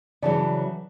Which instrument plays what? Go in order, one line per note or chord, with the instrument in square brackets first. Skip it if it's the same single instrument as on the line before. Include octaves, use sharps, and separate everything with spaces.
[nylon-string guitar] C#3 E3 F#3 [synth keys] D5 A5